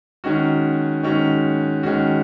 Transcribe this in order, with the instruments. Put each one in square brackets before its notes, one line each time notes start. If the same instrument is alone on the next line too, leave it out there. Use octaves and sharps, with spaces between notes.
[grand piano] D#3 G#3 C#4 F#4
D#3 G#3 C#4 F#4
D#3 G#3 C#4 F#4